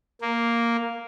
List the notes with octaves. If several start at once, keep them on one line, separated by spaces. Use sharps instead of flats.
A#3